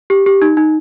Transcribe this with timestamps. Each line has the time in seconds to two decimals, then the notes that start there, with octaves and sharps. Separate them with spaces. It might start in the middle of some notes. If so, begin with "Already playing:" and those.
0.10 G4
0.26 G4
0.42 D#4
0.57 D#4